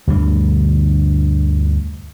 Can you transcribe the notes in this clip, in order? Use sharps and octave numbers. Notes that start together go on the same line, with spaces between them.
D2 G2 B2 D3